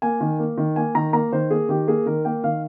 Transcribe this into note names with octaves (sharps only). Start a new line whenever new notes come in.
A#3 G#5
D#3
A#3
D#3
A#3 G#5
D#3 A#5
A#3 A#5
D#3 C5
A#3 G#4
D#3 G4
A#3 G#4
D#3 A#4
A#3 G5
D#3 F5